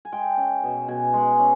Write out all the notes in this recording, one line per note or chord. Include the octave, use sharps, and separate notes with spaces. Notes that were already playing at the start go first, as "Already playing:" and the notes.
G#5
G#3 G5
C#4
B2
B2 G#5
G#3
C#4